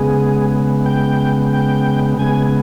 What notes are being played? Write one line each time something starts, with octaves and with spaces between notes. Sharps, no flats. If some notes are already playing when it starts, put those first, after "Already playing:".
Already playing: C#3 G#3 B3 G#4
G5
G5
C#3 G#3 B3 G#5